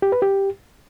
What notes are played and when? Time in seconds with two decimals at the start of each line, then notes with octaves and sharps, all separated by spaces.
0.02 G4
0.12 B4
0.22 G4